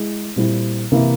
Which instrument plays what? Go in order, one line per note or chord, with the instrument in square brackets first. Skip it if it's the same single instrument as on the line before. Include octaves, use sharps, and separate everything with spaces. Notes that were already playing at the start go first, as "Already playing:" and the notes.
Already playing: [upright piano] G#3 E4
A#2 G3 C4 E4
C3 E3 A#3 E4